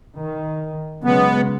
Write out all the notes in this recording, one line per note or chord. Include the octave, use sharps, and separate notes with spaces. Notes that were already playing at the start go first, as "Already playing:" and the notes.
D#3
C#3 F#3 G#3 B3